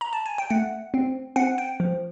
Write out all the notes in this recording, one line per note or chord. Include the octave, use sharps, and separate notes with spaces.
A#5
A5
G#5
G5
A3 F#5
C4
C4 F#5
G5
F3